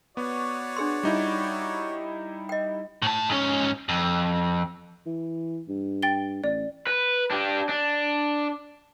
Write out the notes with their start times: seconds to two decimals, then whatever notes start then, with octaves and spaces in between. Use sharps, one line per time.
0.17 B3 F#4 C#5 D5
0.77 D4 G#4 C6
1.03 G3 D#4 E4
2.49 D#5 G5
3.02 A2 A5
3.29 G#2 C#4
3.89 F2
5.06 E3
5.68 G2
6.03 G5 A6 G7
6.44 A1 D5
6.87 B4
7.31 D4 G4
7.69 D4